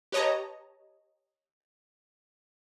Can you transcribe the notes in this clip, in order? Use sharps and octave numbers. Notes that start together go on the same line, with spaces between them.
G4 B4 C#5 D#5 A5 A#5